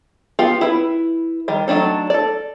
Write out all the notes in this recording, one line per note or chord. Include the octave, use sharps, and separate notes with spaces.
B3 F4 G4
E4 B4
D#3 G3
F#3 A3 D4 D#4
A4 D5